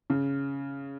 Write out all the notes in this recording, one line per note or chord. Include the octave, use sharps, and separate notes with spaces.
C#3